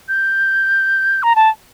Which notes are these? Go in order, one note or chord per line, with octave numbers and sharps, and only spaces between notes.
G6
A#5
A5